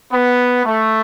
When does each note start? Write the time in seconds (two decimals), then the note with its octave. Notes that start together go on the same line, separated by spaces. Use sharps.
0.13 B3
0.65 A3